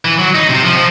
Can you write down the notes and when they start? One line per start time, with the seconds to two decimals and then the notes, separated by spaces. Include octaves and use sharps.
0.05 E3
0.19 F#3
0.35 D#4
0.50 C3
0.63 F3
0.77 F3